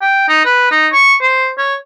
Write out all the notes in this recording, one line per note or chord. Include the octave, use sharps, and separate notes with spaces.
G5
D#4
B4
D#4
C#6
C5
C#5